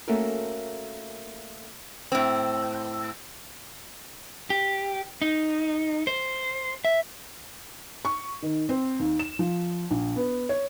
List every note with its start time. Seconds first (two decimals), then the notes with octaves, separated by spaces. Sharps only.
0.08 A3 A#3 C#4 F#4 A4 A#4
2.12 A2 C4
4.50 G4
5.22 D#4
6.07 C5
6.85 E5
8.05 C#6
8.43 D#3
8.69 C4
9.00 D#2
9.19 E7
9.39 F3
9.91 A#1
10.16 B3
10.49 C#5